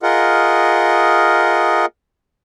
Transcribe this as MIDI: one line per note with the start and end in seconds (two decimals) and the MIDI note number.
0.03 1.86 65
0.03 1.86 68
0.03 1.86 70
0.03 1.86 75
0.03 1.86 78